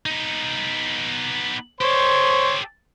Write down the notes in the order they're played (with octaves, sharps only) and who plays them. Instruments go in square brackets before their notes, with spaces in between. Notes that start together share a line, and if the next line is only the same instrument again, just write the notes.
[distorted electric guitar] B3 D#4
[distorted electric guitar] G4 A4 [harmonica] C5 C#5 C6